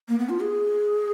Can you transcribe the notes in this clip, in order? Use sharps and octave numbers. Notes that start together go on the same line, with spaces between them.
A#3
B3
F4
G#4